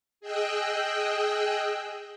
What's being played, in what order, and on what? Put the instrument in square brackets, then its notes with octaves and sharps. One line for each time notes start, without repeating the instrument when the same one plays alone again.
[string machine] G#4 D#5 G5 E6 F#6